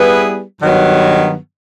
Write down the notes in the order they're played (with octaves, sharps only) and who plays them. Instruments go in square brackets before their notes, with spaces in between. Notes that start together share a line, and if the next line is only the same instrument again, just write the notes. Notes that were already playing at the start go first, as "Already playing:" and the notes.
Already playing: [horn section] G3 B3 E4 G#4 B4
G2 D#3 F#3 B3